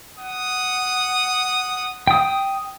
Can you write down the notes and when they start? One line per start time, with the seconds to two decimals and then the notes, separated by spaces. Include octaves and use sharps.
0.19 F#5 D#6
2.07 G5 D#6